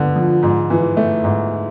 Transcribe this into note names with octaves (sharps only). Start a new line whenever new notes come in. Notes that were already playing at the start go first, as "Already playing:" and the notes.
Already playing: D3 B3
F3
G#2
E3
A3
G#2